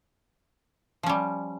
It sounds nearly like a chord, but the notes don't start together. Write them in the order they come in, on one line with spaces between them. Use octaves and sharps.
F3 C#4 G3